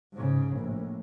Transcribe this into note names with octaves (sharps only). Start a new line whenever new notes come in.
G#2 C#3
A#1 A2